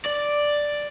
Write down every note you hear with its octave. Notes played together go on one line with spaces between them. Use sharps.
D5